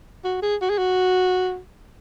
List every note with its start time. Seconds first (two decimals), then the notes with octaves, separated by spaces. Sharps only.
0.24 F#4
0.42 G#4
0.61 F#4
0.70 G#4
0.78 F#4